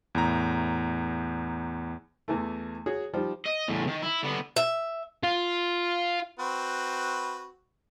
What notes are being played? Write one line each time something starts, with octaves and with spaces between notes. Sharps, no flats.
E2 A2 A#5
E2 E3 A3
F#4 G#4 C#5
F3 G3 D#4
D#5
E2 A2
D#3
E4
D3 B3
E5
F4
C4 F#4 B4